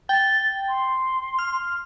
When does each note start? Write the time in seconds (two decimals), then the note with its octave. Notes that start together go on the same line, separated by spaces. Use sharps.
0.09 G5 A6
0.68 C6
1.39 F6